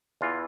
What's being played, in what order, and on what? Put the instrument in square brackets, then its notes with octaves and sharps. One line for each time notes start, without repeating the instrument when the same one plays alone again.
[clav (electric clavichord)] E2 E3 F4